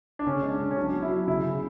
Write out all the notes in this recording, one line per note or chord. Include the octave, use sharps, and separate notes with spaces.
D4
C#3 C#4
G#3
D4
C#3
C#4
F#3 D4
F#3
E4
F#3
C#3 E4
C#3